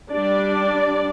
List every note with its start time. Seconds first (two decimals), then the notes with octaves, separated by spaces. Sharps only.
0.11 G3 D4 D5